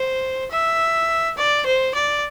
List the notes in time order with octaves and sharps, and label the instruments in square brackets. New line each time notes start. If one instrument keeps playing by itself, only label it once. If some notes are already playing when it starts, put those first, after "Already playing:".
Already playing: [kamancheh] C5
E5
D5
C5
D5